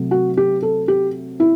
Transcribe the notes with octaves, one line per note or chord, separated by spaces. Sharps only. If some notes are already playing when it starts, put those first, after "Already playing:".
Already playing: C3 F#3 A3
F#4
G4
A4
G4
E4